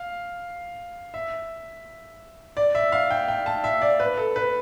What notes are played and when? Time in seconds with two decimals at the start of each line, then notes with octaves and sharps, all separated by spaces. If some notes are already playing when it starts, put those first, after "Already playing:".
Already playing: F5
1.14 E5
2.57 D5
2.75 E5
2.92 F5
3.11 G5
3.28 G5
3.46 A5
3.64 E5
3.82 D5
4.00 B4
4.17 A4
4.36 B4